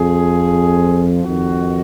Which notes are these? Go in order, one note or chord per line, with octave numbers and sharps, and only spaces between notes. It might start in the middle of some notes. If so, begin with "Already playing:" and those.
Already playing: F2 F3 G#4
F2 D#3 F#4